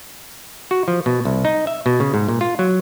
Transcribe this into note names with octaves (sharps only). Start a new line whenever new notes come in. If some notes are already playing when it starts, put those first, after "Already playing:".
F#4
F3
B2
C2
D#4
E5
B2
C#3
G#2
A#2
F4
F#3